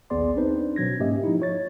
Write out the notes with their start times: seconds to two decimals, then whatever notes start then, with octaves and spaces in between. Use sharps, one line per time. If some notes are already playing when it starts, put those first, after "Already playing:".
0.10 A#1 D#2 B3 G#4 D5 C6
0.36 C4 D4 D#4 B4 C5
0.76 B2 F#3 G#6 A#6
0.99 G#2 A#3 C#4 G4 D#5 E5
1.24 F3 D#4 E4
1.40 F4 C#5 A6